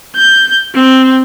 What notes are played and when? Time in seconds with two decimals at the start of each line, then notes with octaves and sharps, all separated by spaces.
0.16 G6
0.75 C4